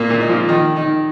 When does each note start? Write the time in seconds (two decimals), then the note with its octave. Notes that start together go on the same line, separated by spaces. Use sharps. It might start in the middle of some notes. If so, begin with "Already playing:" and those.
Already playing: A#2 A#3
0.10 A#2 A#3
0.21 D#4
0.29 F3 F4
0.49 D#3 D#4
0.76 D#3 D#4